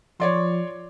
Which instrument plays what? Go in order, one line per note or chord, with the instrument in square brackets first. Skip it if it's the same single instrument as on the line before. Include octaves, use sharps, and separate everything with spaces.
[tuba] F3 [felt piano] C#5 D5 C6